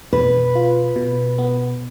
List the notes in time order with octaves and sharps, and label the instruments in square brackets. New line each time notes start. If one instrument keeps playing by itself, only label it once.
[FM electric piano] B2 [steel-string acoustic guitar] B4
[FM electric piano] F4
B2
B3